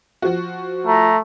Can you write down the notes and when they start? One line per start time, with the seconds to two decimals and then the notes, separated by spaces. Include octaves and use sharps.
0.22 F3 F#4
0.87 A3 A#5